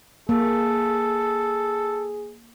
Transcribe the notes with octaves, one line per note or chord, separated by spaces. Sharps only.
A#3 G#4 A4